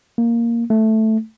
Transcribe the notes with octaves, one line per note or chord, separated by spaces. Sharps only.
A#3
A3